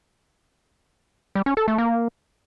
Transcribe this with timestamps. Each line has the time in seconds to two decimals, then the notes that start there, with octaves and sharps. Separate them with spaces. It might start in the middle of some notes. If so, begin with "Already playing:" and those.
1.35 G3
1.46 C#4
1.57 A4
1.68 A3
1.78 A#3